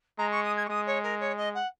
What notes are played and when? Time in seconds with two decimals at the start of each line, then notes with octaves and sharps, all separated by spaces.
0.18 G#3 A#5
0.31 C#6
0.44 D#6
0.56 G#6
0.66 C#6
0.69 G#3 D#6
0.86 C#5
1.03 A#4
1.20 C#5
1.37 D#5
1.54 F#5